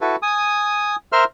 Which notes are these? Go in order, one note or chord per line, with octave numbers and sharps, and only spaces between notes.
E4 F#4 A4 B4
G#5 D#6
A#4 C5 E5 C6 F6